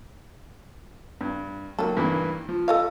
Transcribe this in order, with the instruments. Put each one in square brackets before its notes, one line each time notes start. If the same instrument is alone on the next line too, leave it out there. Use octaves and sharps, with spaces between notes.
[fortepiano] G2
[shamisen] D#3 A4 [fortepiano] F#3 A#3
[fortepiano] G2 E3 A#3
F3
[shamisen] A4 D#5 F5